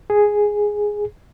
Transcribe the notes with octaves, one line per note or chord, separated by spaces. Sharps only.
G#4